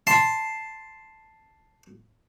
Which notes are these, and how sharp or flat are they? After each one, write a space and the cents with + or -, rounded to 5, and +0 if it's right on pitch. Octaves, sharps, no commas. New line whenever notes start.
A5 +0 C6 +0